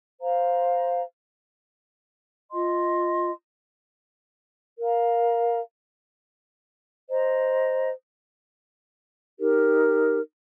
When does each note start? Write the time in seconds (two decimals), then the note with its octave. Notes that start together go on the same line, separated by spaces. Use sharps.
0.21 C5 F5 A#5
2.50 F4 D#5 C6
4.79 A#4 F5 A#5
7.09 C5 D#5 A#5
9.39 D#4 G4 A#4